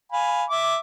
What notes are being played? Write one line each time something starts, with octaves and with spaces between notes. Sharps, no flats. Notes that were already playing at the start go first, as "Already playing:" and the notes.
F5 G#5 B5
E5 D6